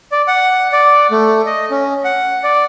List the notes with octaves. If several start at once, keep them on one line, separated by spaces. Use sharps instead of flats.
D5
F#5
D5
A3
D#5
C#4
F#5
D5